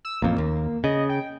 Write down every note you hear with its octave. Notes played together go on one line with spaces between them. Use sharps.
E6
A1 F2 A#3
D#2
C#3 D#5
G5